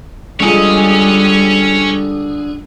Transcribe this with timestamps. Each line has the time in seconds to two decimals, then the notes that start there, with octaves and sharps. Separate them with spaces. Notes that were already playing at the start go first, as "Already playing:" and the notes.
0.40 D3 G3 G#3 F4 G#4 C#5 G#5